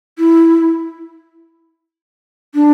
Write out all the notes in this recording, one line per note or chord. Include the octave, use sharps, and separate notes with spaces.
E4
D4